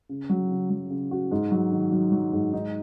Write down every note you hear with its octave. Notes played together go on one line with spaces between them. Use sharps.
C#3
F#3
C#3
F#3
C#3
F#4
G#2
F#3
D#3
F#3
F#3
G#2
D#4